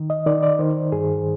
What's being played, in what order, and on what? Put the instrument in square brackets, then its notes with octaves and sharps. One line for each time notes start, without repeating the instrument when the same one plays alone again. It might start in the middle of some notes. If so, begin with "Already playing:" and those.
Already playing: [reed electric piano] D#3
D#5
D#3 D5
D5
D#3 C5
G2 G#4